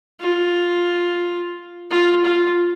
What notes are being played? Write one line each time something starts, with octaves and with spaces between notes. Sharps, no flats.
F4
F4
F4